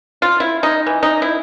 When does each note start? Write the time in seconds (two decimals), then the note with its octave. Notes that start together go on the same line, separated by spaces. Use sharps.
0.22 F4
0.40 E4
0.63 D#4
0.86 E3
1.03 D#4
1.22 E4